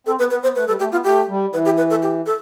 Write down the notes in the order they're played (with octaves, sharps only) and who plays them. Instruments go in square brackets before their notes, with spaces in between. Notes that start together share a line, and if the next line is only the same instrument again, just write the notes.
[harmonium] C4 [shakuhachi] A4
[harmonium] B3 [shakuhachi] B4
[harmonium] B3 [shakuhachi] B4
[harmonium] B3 [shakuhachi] C5
[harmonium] A3 [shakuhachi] B4
[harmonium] G3 [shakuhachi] A4
[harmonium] A3 [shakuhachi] G4
[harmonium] B3 [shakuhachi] F4
[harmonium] A3 [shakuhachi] G4
[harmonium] G3
[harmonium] E3 [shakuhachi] B4
[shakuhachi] G4
B4
A4
G4
A4